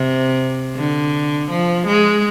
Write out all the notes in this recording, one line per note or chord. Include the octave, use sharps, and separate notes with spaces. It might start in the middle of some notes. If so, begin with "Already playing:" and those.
Already playing: C3
D3
F3
G#3